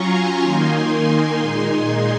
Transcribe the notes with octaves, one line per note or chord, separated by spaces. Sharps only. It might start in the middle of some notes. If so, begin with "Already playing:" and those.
Already playing: F#3 C#4 F4 G#5 A#5 C6 C#6
D#3 A#3 D#4
A#2 G#3 D#4 G#5 C6